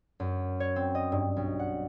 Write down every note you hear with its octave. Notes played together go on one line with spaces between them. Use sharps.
F#2
C#5
C4
D#5
G2
B1
F#5